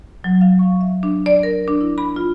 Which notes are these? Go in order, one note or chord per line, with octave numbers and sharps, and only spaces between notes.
F#3
F5
C#6
E5
D4
D5
A#4
D4
E4
B5
F4